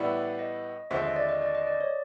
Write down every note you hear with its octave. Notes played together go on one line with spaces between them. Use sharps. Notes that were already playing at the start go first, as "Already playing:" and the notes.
Already playing: A2 E3 G3 B3 E4 D5
D#5
D#2 D3 F3 G#3 C4 E5
D#5
D5
D#5
D5
D#5
D5
C#5